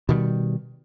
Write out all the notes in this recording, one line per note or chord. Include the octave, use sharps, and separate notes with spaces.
B2 D#3 F3 G3